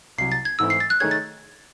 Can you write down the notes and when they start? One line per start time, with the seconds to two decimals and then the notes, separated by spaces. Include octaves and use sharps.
0.18 C2 C3 F#3 C7
0.32 A6
0.45 G#6
0.59 G#2 E3 A3 C4 E4 E6
0.70 C7
0.80 A6
0.90 F#6
1.00 D#3 A3 D#4 G#4 C#5 G#6
1.11 A6